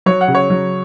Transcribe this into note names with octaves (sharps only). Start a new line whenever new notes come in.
F#3 C#5
F#5
C#3
C#5
F#3